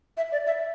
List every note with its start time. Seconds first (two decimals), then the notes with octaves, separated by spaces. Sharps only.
0.17 E5
0.32 D5
0.47 E5